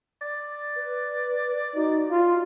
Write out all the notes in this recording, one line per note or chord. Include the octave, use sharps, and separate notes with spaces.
D5
B4
D#4 F#4
F4